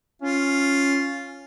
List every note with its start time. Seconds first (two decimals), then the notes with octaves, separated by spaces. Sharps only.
0.22 C#4 F4